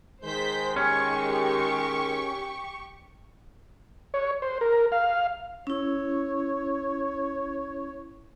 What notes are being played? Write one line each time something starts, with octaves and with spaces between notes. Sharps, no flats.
D#3 G#3 C5 G6 B6
C#4 G4 C#6
C#5
C5
A#4
F5
C#4 E4 C#5